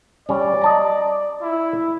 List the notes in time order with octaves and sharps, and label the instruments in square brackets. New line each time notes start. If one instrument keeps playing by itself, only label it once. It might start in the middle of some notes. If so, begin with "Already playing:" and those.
[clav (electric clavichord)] G3 C#4 [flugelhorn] D5
[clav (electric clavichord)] D#5 A5 A#5
[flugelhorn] E4